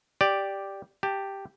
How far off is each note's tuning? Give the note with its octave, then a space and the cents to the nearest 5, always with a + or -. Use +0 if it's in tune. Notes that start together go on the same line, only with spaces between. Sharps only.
G4 +0 D5 +0
G4 +0 A5 +15